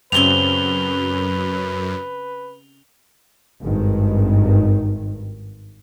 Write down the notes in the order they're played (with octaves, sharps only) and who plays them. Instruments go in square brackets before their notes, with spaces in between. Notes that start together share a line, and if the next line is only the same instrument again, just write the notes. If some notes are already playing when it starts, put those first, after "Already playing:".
[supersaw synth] F#2 [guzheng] C#3 C4 G4 [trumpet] B4 [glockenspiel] F7 G7
[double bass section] G#1 G2 D#3